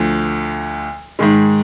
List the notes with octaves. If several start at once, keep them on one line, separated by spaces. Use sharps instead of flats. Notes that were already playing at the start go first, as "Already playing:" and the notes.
Already playing: D2 D3 F3
G#2 D#3 G#3